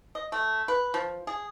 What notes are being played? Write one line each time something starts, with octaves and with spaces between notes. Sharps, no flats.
D#5
A3
B4
F3
G#4